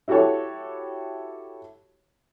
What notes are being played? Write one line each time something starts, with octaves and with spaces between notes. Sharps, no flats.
E4 F#4 G4 A4 C#5